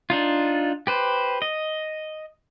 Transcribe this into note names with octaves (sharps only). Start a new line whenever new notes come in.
D4 D#4 F4
G4 B4 C5
D#5